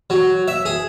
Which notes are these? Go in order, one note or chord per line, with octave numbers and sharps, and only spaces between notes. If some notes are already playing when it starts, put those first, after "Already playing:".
F#3
E5
G#4